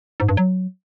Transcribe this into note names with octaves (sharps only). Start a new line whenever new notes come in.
G#2
G2
F#3